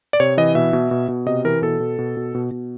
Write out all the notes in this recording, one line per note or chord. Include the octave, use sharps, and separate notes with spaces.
D5
C3 C#5
E3 D#5
B2 E5
B2
B2
B2
C3 D#5
E3 A#4
B2 A4
B2
B2
B2
B2
B2